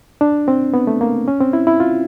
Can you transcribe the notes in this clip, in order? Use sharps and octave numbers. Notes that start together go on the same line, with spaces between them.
D4
C4
B3
A3
A#3
C#4
C4
E4
E4
F4